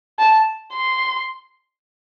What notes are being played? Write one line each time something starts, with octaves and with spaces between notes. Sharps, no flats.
A5
C6